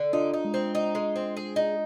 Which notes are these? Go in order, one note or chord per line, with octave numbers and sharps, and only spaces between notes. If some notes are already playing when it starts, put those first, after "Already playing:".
Already playing: D3
D4 D#4 F4
D#4
G#3
C4
D#4
G#3
C4
G#4
D#4